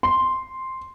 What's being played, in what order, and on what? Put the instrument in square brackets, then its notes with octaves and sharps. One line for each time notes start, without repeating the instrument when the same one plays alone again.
[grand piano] C6